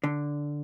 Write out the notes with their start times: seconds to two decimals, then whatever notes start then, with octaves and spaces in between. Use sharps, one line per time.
0.03 D3